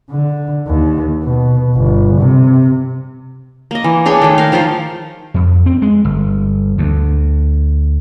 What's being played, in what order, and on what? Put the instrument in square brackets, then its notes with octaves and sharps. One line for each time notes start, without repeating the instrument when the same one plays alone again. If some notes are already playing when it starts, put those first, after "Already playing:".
[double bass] D3
D#2
B2
G1
C3
[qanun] A#3 D#5
E3
D4 G#4 C#5 G5
D#3 A3
A#4 F5
D#3 F3 F4 C5
[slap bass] F2
C4
G#3
G1
D2